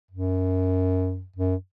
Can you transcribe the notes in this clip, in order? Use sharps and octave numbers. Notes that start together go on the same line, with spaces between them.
F#2
F#2